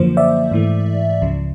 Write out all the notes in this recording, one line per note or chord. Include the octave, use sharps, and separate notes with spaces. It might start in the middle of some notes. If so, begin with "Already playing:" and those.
Already playing: F#2 D3 F3 A#3 C5
D5 E5
G#2 E3 A3
C#2 C#3 F3